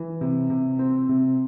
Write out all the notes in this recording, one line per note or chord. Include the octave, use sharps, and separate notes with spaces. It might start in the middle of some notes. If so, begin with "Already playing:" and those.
Already playing: E3
C3
C3
C4
C3